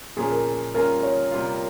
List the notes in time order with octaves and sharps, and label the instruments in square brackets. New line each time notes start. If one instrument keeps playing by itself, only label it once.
[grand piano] A#2 F3 A#3 C#4 [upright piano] G#4
[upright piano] A#4
[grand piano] G3 A#3 C#4 F4 G#4 [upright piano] A#4
[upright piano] C#5
[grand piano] C3 G3 A#3 F4